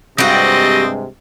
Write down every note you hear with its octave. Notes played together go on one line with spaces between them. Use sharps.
G2 C3 G3 G#3 C4 F#4 D#5